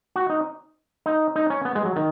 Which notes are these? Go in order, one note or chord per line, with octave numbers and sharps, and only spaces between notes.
F#4
D#4
D#4
D#4
C#4
B3
G#3
F#3
D#3